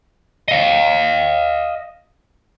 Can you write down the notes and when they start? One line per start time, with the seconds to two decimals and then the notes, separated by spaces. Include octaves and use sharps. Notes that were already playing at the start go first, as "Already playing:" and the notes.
0.48 D#5 F5